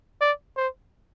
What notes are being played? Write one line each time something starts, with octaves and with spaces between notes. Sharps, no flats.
D5
C5